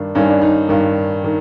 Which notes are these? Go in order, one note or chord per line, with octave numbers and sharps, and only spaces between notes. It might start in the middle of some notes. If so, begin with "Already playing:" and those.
Already playing: G2 D#3 D4
G2 D#3 C#4
D4
D#4
G2 D#3
D#3